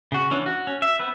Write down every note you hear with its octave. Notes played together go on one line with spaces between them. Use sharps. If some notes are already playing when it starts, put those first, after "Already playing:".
C#3 F#4
E3 C#4 D4
F#4
C#4
E5
B3 C4 B4